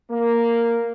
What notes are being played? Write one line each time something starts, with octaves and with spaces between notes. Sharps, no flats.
A#3